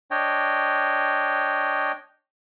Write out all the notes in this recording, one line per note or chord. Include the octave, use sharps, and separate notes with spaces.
D4 C#5 D#5 G5